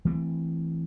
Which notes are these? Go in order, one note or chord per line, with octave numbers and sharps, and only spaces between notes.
E3 A3 C4